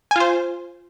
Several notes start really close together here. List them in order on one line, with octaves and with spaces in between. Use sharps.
G#5 F4 C5